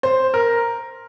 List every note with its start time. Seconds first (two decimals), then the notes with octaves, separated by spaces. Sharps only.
0.03 C5
0.34 A#4